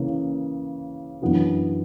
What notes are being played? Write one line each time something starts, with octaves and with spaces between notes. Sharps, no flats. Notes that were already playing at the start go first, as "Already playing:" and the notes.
Already playing: C#3 E3 A#3
F#2 E3 B3 D4 F#4